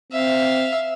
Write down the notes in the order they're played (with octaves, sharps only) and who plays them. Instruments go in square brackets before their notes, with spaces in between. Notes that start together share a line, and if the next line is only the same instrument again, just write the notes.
[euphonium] C4 [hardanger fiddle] E5 F5